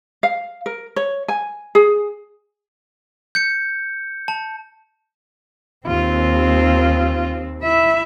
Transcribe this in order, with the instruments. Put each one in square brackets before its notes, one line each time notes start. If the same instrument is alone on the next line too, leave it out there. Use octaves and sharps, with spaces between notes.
[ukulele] F5
A#4
C#5
G#5
G#4
[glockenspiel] G6 C#7
A5
[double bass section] D#2 [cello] C4 [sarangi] F4
[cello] E4 E5